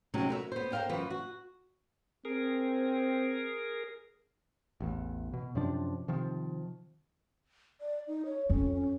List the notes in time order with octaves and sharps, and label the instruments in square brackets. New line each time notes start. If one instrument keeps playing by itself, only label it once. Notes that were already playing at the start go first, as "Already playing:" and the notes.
[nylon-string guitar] C3 F#3 G#3 C4 C#4 D#4
F#4 A#4 B4 E5
B3 C5
A#4 C5 D#5 F5 G5
F#2 E3 F4 B4
F#4
[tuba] C4 [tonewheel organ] G#4 A#4
[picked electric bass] A1 E2
B2
F#2 C3 F3 D4
C3 D#3 F3
[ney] D5
D#4
C#5
[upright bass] F2 [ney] C#4
[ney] C#4